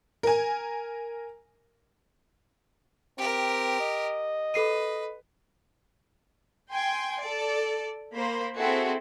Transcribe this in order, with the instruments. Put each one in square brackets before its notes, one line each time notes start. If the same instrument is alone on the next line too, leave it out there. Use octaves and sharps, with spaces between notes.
[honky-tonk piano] A#4 G#5
[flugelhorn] C4 [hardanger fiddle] G4 A#4
[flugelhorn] D#5
[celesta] A4 C7 D#7 [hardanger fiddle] B4
[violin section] G5 G#5 C6
A4 D5
A#3 C5 B5
C4 E4 F#4 G#4 A4